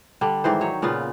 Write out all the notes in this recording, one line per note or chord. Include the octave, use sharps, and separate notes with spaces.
D3 G3
G#2 D#3 E3 C5
F#3 C#5
A#2 C#3 B3 F4